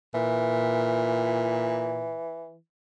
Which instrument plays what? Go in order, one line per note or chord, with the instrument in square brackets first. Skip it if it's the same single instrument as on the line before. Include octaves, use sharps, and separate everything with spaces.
[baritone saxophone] A#2 [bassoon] E3